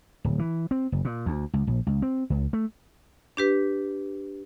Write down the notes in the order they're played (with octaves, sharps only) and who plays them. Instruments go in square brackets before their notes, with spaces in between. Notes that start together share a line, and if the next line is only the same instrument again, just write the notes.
[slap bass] D1
E3
C4
F#1
A#2
D2
C#2
A#1
C#2
C4
C#2
A3
[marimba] D4 G4 B4